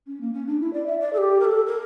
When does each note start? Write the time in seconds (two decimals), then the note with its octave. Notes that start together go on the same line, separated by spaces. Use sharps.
0.07 C#4
0.21 A#3
0.33 C#4
0.46 D4
0.60 E4
0.73 D5
0.86 E5
1.00 D5
1.13 A4
1.18 G4
1.40 A#4
1.45 A4
1.66 A#4